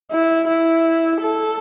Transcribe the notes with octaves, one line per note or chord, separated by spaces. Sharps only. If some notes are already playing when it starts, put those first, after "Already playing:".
E4
E4
A4